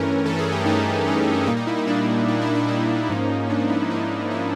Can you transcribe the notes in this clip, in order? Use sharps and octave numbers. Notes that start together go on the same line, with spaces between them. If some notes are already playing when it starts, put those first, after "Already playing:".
Already playing: G2 E3 A3 C#4 A#4
G2 E3 A3 C#4 A4
G#4
G4
G2 E3 A3 C#4 D#4
G2 E3 A3 C#4
A#2 G3 A#3 D#4
D#4
E4
D#4
A#2 G3 A#3 D4
A#2 G3 A#3 D#4
E4
D4
A#2 G3 A#3 D#4
G#2 F3 A#3 C#4
G#2 F3 A#3 C#4 D4
D#4
E4
D#4
G#2 F3 A#3 C#4 D#4
F3 A#3 C#4 E4